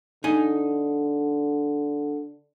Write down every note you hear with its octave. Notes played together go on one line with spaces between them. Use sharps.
D3 D#4 G#5